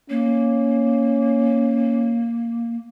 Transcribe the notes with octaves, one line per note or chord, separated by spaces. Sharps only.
A#3 C#4